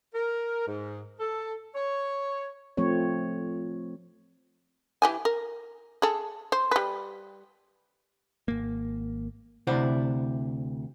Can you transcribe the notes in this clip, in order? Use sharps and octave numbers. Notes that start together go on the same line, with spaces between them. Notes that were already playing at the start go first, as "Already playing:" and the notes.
A#4
G#2
A4
C#5
F3 A3 C4 C#5
E3 G4 G#5
A#4
G#4 A4
C5
G3 B4
G#1 A#3
D2 C3 E4 C5 D5 F#5